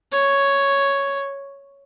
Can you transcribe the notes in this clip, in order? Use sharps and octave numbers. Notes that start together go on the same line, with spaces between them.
C#5